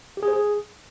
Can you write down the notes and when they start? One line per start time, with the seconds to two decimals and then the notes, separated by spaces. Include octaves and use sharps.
0.17 G4
0.23 G#4
0.28 C5
0.33 G#4